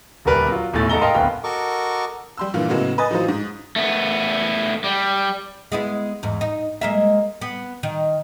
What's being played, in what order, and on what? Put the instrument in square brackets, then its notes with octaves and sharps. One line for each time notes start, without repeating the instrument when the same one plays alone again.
[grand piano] D#1 D2 G3 A#4 B4 D5
F#3 F4
D#1 B1 A2 A3 A6
G#2 A4 D#5 A#5 G7
A#4 D#5 F5 G5 A5 C6
D1 G1 D2 B3 F5 G5
[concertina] F#4 A4 A#4 D#5 C#6 D6
[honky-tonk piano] G3 C6 E6
G2 A#2 E3 F5
A2 C#3 F#3 G#3 A#3 B3
B4 D#5 G#5 D#6 A6
A2 E3 F#3 D#4 F4 C5
G#2
[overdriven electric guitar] A3 B3
G3
[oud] G#3 B3 E4
E2 G#2
D#4
G#3 A#3 E5
B3
D#3